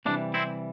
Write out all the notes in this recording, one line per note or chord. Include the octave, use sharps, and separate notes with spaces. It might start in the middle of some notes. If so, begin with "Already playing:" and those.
C3 E3 G3 A#3 D4
C4 E4